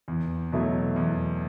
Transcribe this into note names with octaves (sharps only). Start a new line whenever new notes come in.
E2
B2 F#3 A3 E4
E2